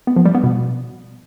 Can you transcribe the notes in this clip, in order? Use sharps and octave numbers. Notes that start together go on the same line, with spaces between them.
B3
F3
G3
B3
B2